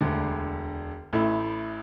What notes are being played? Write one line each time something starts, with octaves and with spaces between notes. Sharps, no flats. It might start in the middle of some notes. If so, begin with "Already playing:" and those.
E1 D2 D3
A1 A2 A3 E4